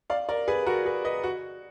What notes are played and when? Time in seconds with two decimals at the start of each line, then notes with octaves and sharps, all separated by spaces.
0.10 D5 F5
0.29 A#4 D5
0.48 G#4 B4
0.66 F#4 A#4
0.86 G#4 B4
1.05 B4 D#5
1.24 F#4